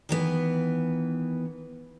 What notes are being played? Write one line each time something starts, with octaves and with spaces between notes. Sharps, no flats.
D#3 E3 B3